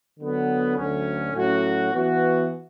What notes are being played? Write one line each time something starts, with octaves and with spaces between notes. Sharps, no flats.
D3 F#3 B3
D2 D3 F#3 C#4
A2 F#3 C#4 F#4
E3 B3 F#4